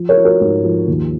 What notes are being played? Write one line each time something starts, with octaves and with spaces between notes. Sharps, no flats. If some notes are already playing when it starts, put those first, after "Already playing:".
Already playing: F3
A#4 C#5
F3
F#4 A#4
G#2
F3
D#2